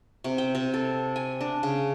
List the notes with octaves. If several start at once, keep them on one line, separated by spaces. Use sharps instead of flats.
C3
G5
C3
A4
G#5
D4
C#3